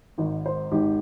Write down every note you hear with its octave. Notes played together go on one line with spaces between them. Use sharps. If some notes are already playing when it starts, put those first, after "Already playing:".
G#1 G#2 D#3
C5
G#1 G#2 D#3 G4